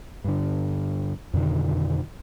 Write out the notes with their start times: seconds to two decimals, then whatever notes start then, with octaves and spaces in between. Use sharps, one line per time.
0.24 G2 D3
1.34 F2 B2 D3 D#3